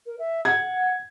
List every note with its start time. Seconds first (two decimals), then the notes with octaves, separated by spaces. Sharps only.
0.05 A#4
0.18 E5
0.45 F#5 G#6